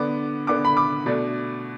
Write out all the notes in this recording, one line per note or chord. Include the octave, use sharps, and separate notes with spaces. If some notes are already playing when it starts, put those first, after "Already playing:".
Already playing: D3 B3 D4 D6
D3 B3 D4 D6
B5
D6
B2 A3 D4